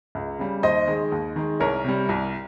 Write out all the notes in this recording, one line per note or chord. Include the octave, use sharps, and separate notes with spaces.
C#2
C#3 G3
D#2 C5 D#5
D#3 G#3
D#2
D#3 G#3
C2 A#4 C#5
C3 G3
C2